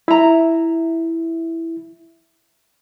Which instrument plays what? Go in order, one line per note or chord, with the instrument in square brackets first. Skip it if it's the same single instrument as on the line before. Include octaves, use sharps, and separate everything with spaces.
[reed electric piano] E4 [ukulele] E5 A#5